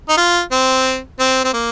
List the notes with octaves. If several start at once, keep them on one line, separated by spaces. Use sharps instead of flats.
D#4
F4
C4
C4
C4
A#3